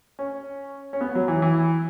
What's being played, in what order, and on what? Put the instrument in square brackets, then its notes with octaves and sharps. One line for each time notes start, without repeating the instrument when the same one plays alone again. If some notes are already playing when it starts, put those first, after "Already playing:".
[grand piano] C#4
C#4
B3
F#3
E3
E3